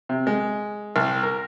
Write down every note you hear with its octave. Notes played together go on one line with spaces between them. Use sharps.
C3
G#3
C2
A#4